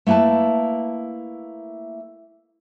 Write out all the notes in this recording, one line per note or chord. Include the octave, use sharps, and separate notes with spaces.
A3 A#3 E4 B4 A5